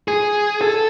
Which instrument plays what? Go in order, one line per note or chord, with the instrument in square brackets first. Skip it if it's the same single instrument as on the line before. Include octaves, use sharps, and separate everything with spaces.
[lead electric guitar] G#4
A4